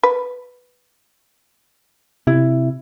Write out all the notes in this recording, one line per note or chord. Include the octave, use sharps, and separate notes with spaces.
B4
C3 E4